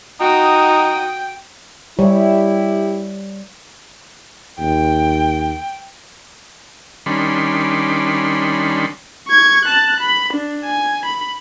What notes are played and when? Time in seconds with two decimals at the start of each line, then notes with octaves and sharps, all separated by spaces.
0.20 D#4 F#4 G5 D#6
1.99 G3 E4 G4 C#5
4.59 D#2 G5
7.06 D#3 G3 C#4 D4 B5 C6
9.28 C#6 G#6
9.65 A5 F#6
10.00 B5
10.33 D4
10.65 G#5
11.05 B5